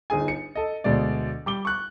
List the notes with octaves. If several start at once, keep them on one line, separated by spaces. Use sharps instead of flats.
G1 D#4 G#4 G#5
C#7
A4 D#5
D2 B2 G#3 D5
G3 D6 G7
C#6 F#6